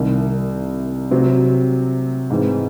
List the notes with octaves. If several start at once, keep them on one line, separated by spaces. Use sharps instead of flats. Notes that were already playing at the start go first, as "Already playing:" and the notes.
Already playing: C2 C3 D#3
C3 F#3 C4
G#2 E3 C4